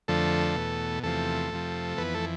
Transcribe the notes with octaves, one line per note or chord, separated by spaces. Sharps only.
F2 D3 F3 A3 A4
E2 B2
E2 C3 F3 A3 A4
F2 C3 F3
F2 E3 B3 B4
A3 A4